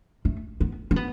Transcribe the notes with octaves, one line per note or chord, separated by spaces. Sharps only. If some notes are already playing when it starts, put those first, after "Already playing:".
A3
B3
C#4
B3